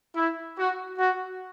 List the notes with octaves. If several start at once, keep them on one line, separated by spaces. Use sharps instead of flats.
E4
F#4
F#4